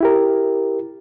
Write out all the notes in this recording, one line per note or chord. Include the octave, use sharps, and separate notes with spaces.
E4 G4 A#4